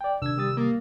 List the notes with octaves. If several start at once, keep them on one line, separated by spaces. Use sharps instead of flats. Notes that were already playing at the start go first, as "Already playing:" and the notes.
D5 G5
C3 D#3 D4 E6 G#6
G3 D#6 A6
A#3